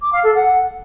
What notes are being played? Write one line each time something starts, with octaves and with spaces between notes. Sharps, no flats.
D6
F5
A4
F#5